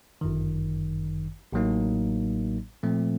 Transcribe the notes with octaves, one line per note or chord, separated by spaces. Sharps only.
G1 F#2 D#3
A1 A2 F#3 A#3 D#4
A#2 F3 A3 C4